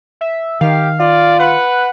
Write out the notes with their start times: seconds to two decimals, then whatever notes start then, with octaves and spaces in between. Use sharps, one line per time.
0.21 E5
0.61 D#3 G4 F5
1.00 F4 D5
1.40 B4 F#5